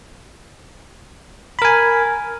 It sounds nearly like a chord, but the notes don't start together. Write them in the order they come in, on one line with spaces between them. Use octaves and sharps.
B5 A#4 G#5